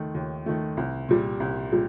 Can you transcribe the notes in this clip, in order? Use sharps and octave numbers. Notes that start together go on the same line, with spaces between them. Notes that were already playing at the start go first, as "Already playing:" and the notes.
Already playing: D#2 D#3 A3
D#2
D#3 A3
C2
A#2 G3
C2
A#2 G3